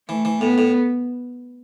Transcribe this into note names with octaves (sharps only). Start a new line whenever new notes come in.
E3 A3
E3
A2 B3
A2